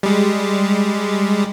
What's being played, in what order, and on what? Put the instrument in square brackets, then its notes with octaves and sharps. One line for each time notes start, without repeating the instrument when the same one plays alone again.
[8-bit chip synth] G3 G#3